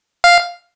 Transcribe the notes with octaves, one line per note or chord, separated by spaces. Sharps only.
F5